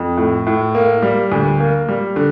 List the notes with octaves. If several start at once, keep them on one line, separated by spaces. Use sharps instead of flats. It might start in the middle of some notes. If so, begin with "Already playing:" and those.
Already playing: F2
A2
A2
A#3
G3
D2
A#3
G3
D3